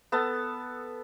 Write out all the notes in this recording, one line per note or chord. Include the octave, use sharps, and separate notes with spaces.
B3 A4 A5